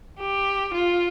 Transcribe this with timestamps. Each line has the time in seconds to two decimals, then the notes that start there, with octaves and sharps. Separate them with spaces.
0.20 G4
0.74 F4